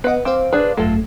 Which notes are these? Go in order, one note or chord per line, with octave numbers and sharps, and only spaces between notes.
B3 B4 D#5 F#5
C4 C5 F5 D6
D4 G#4 B4
G#1 F#2 F#3 A3 F4 A4